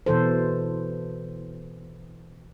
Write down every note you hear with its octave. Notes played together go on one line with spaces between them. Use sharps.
B2 E3 A4 C5